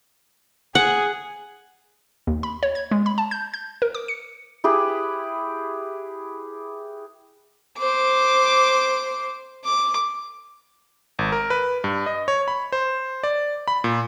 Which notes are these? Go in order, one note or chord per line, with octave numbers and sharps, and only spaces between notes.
G#4 F#5
D#2
B5
C#5
G#6
G#3
B5
A5
G6
G6
A#4
D6
C#7
E4 G4 G#4 B4
C5 D6
D6
G#1
A#4
B4
G2
D#5
C#5
B5
C5
D5
B5
A#2